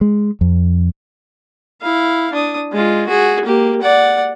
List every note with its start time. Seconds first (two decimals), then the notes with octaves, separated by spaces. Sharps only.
0.01 G#3
0.41 F2
1.81 E4 F5
2.33 D4 D#6
2.72 G#3 F4
3.07 F#4 G#4
3.45 A#3 G4
3.81 D5 F#5